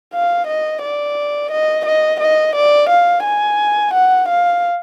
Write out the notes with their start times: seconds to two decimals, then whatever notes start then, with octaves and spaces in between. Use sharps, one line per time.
0.13 F5
0.47 D#5
0.82 D5
1.51 D#5
1.86 D#5
2.20 D#5
2.56 D5
2.90 F5
3.24 G#5
3.94 F#5
4.28 F5